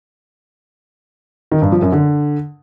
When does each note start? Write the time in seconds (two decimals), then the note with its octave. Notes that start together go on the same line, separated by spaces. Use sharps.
1.52 D#3
1.62 G2
1.72 F3
1.82 F#2
1.92 D3